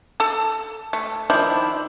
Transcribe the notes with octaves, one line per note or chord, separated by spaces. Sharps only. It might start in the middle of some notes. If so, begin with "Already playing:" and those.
A4 A5
A3
D#3 F3 D4 E4